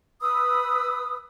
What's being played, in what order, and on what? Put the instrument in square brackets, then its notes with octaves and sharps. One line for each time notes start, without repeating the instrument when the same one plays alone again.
[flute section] B4 B5 D#6 E6